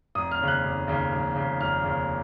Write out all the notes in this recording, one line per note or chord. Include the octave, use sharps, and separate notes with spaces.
F1 D#6
F6
D#2 C#3
F#6
F1
D#2 C#3
F1
D#2 C#3
F1 F6
D#2 C#3